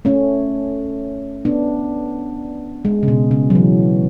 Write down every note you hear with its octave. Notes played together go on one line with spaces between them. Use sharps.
A3 C#4
B3 D4
G#3
C#3
B2
C#3
F#3
E3